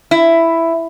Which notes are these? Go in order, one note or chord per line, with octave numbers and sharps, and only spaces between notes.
E4